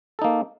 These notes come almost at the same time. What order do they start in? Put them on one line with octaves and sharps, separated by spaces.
A4 D#4 A#3